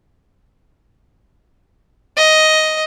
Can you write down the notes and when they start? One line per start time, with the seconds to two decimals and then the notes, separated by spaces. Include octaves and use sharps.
2.17 D#5